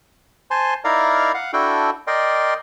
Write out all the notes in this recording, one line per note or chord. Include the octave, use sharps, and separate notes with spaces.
C5 G#5 A5 C6
D#4 E4 A#4 D5 F5 A#5
F5 F#5
D4 E4 F#4 A4 G5
A#4 D5 D#5 G5 C6